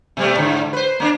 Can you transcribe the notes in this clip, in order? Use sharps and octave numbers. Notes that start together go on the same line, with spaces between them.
B2 G3 A3
G#2 D3
B4 C5
A#3 C#4 D4